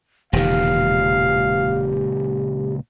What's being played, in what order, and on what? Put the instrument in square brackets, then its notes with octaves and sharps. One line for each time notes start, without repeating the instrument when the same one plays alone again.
[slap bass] E1 D#3 [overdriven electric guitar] C#2 A#2 [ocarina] G4 [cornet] F5